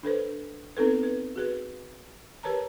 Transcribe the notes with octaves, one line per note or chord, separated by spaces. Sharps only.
D4 A4 B4 C5
B3 C4 D#4 A4 B4
B4
F#4 G#4 B4
G4 A#4 B4 C#5 A5 A#5